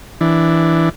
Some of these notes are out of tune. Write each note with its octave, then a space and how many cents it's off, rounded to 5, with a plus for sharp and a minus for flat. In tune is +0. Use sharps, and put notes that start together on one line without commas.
E3 +0 D4 +0